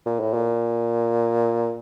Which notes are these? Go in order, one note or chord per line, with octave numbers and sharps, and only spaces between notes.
A#2
A2
A#2